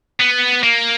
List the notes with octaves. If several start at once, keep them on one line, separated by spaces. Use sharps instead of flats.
B3
A#3